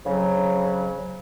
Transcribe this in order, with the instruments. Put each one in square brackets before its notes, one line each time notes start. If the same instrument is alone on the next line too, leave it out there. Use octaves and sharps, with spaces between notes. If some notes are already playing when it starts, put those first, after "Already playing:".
[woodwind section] F2 C#3 F#3